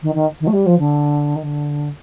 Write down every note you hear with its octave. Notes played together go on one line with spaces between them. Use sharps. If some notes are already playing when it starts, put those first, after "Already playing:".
D#3
D#3
D#3
A3
G3
F3
D3
D#3
D3